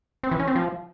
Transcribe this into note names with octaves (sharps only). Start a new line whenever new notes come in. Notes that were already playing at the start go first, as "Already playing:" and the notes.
C4
E3
C#4
C4
F3